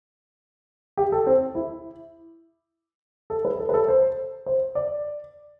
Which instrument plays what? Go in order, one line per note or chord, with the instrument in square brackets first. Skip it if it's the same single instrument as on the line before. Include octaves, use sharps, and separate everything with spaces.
[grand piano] G4
A4
C4
E4
A4
B4
A4
B4
A4
C5
C5
D5